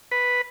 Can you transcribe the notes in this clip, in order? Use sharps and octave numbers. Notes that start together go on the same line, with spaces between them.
B4